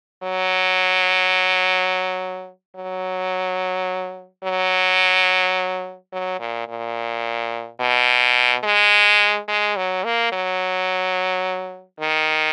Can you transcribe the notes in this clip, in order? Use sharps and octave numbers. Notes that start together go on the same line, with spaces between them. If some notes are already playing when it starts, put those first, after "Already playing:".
F#3
F#3
F#3
F#3
A#2
A#2
B2
G#3
G#3
F#3
A#3
F#3
D#3